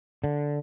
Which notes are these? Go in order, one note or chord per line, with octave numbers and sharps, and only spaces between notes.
D3